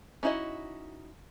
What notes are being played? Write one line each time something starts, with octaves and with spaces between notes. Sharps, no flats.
C#4 D#4 E4 F#4 D#5